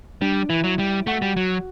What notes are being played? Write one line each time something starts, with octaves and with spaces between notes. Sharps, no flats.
G3 D4
E3 E4
F#3
G3
A3 F#4
G3
F#3